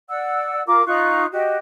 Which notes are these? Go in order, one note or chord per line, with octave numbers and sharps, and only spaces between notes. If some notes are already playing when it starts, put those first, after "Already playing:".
D5 F#5 E6
F4 A#4 D6
D#4 F4 C#6 F#6
F#4 G4 D#5